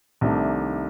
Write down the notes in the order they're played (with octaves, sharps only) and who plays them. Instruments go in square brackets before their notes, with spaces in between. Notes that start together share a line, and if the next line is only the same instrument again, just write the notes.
[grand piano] C2 C3 D#3 A3 D4